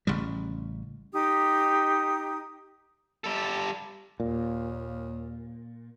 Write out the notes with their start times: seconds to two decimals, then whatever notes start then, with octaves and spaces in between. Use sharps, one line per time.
0.07 A1 C#3 G3
1.13 D#4 G4 D#6
3.24 G3 A4
4.20 D#2 A#2